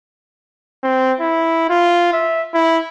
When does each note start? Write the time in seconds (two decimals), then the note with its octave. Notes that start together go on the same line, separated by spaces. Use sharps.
0.83 C4
1.20 E4
1.70 F4
2.13 E5
2.54 E4